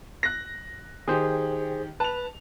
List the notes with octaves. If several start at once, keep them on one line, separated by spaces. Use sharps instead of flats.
F#6 A#6
D#3 G4 G#4 C5
B4 A5 F7